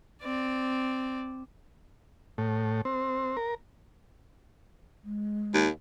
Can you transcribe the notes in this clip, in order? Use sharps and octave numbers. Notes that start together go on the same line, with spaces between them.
C4 D5
A2
C4
A#4
G#3
D#2